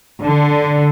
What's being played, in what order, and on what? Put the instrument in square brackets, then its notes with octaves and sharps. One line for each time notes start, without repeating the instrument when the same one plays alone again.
[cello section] D3